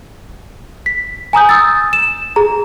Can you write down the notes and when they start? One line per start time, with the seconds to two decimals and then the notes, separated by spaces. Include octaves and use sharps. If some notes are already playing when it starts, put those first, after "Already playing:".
0.86 B6
1.33 G#5 A#5 D#6 G6
1.49 D#6 E6 A6
1.93 E7
2.36 G#4 A#5